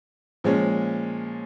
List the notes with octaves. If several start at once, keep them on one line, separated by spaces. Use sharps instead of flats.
A#2 F3 G#3 C#4